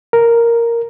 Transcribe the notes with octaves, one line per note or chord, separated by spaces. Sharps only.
A#4